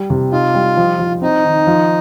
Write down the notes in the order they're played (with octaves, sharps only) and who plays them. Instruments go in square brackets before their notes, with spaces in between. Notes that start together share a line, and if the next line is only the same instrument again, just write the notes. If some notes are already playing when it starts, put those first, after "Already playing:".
Already playing: [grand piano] G3
C3
[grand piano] D#4 [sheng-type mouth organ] F4
[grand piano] G3
F3
F3
[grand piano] C4 [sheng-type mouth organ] D#4
[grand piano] D#3
F3